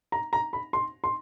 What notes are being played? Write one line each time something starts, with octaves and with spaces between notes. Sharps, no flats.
A#5
A#5
B5
C6
C6